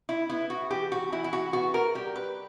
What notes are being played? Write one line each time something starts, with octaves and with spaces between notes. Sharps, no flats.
E4
B3 E4
F#4
E3 G4
F#4
E3 E4
E4
F#4
B3 F#4
A#4
G3 G4
B4